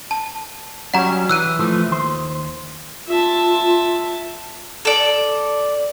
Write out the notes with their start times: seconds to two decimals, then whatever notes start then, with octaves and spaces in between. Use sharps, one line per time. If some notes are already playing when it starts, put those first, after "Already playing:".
0.11 A5
0.94 F#3 G3 C#4 F#5 A#5
1.29 E3 E6 F#6 D#7
1.59 E3 F3 A3
1.88 D#2 C5
3.08 F4 E5 A5
4.85 A4 D5